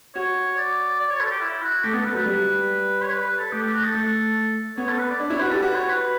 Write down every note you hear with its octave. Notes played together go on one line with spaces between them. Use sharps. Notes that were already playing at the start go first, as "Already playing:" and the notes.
F#4 C#5
D5
D5
C#5
A4
G4
E4
F#4
A3 G4
B3 A4
A3 B4
F#3 B4
G3
C#5
B4
B4
A4
A3 G4
G4
F#4
A4
A3
B3 C#5
A4
B4
D5
D4
E4 C#5
F#4 B4
G4 A4
F#4 B4
C#5
B4